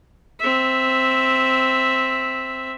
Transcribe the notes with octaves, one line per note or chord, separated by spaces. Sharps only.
C4 E5